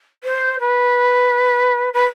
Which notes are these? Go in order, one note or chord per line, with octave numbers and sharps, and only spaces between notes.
C5
B4
B4